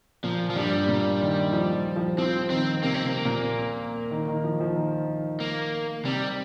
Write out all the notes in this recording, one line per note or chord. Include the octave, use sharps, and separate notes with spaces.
A#2 F3
F3
G2 G3
A#2
D#3
F3
G3
F3
F3 C4
D#3 C4
C3 A#3
C4
C3 A#3
A#2
D#3
D#3
F3
F3
D#3
A#3
C3 G3